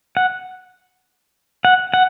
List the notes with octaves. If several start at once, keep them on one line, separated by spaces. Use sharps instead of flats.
F#5
F#5
F#5